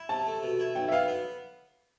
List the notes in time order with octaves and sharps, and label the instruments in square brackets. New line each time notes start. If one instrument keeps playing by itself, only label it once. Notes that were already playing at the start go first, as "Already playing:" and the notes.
Already playing: [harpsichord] E4
[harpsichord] C3 [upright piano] A5
[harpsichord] A3
B2
E4
[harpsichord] B1 [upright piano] G5
[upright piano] E5
[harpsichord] B3 [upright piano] F5
[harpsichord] B3